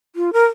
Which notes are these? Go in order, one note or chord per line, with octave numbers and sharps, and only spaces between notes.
F4
A#4